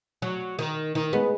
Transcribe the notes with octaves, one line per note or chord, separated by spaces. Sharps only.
F#3
D#3
D#3
G#3 B3